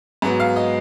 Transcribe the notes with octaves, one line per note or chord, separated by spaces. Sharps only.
G#2 F#3 B3
F5
D#5